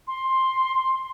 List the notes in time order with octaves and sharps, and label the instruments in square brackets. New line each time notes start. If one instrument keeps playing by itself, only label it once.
[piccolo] C6